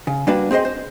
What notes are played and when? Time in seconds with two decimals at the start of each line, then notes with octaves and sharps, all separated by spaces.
0.07 C#3
0.27 G3 A#3 D4 F#4 B4 D5
0.51 C4 G#4 C5 D#5 C6
0.65 C5